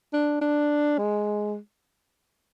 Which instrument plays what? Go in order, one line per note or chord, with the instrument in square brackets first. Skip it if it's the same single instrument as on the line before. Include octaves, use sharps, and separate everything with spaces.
[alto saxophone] D4
D4
G#3